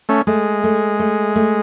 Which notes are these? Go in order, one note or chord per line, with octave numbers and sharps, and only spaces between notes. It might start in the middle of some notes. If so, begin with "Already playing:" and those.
A3 C#4
G#3 A3
A3
A3
A3